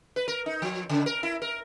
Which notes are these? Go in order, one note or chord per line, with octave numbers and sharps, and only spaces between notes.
B4
A#4
D#4
F3
C#3
A#4
E4
A#4